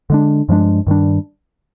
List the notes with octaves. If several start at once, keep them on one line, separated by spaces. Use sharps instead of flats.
D3 G#3 D4
G2 F3 G#3 D4
G2 D#3 G3 D4